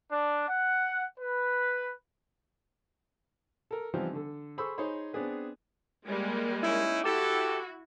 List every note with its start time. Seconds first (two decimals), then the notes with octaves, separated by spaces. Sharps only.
0.12 D4
0.48 F#5
1.19 B4
3.71 A4 A#4
3.94 E3 F3 G3 B3 C4 D#4
4.13 D3 A4
4.58 G#4 A4 C5 B5 C#6 E6
4.78 D#4 G#4 C5 C#5 B5
5.13 B3 C4 D4 G#4 B4
6.05 G3 G#3 A#3
6.63 C#4 D#4 E4
7.04 E4 F#4 G4 A4